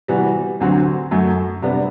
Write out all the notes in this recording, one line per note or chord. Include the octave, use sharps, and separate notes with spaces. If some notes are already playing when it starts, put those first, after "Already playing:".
C3 E3 G3 B3 F#4
D2 D3 F#3 C4 F#4
F#2 F#3 A3
C3 G3 B3 D4